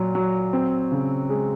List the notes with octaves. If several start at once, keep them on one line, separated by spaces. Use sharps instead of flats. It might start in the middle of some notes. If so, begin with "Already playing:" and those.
Already playing: A#2 F#3
F#3
C4
C#3
G#3